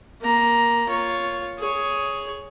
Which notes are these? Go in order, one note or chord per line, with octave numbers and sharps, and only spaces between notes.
A#3 A#5
F4 C#5
G#4 C#5